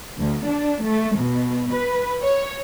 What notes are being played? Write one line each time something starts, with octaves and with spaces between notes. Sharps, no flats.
D2
D4
A3
B2
B4
C#5